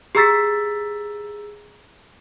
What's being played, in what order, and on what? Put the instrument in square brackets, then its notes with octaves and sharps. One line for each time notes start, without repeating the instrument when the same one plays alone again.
[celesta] G4 G#4 A#5 E6 A6 B6